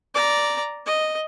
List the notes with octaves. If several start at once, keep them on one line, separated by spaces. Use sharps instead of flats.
D5 A#5
D#5